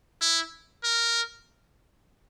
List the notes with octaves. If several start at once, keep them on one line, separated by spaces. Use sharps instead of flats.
E4
A#4